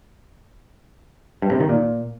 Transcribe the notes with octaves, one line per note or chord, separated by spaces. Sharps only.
G2
C3
D#3
A#2